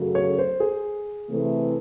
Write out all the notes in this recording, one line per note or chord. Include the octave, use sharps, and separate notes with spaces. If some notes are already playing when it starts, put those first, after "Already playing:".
Already playing: F#2 C#3 F#3 A3
C#5
C5
G#4
C3 E3 A3